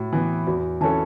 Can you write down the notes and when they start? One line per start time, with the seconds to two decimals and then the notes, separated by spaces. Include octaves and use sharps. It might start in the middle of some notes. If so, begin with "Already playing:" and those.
Already playing: A2 F#4
0.13 E3 B3
0.47 E2 F#4
0.81 E3 C#4 A4 A5